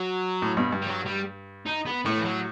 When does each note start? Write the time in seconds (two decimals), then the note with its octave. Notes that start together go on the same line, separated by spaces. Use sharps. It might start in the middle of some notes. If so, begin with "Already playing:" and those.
Already playing: F#3
0.42 A2
0.57 G2 B2
0.72 G2
0.82 G3
0.87 F#3
1.06 G3
1.66 D#4
1.86 B3
2.06 A2 A3
2.18 E3
2.25 F#3